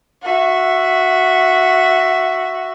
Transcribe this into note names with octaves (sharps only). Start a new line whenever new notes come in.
F#4 E5